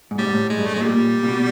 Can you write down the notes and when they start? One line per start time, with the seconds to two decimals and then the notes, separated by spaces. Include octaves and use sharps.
0.11 G#2
0.18 A2 G3
0.26 G#2
0.34 A2
0.50 G#3
0.58 G2
0.66 A3
0.74 A2 G#3
0.81 A#2 G3
1.23 A#2
1.28 B2